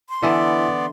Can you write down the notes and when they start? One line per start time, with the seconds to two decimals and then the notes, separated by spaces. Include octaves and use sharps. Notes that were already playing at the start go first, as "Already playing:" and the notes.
0.09 C6
0.23 D3 E3 B3 E4 D5 E5 G#5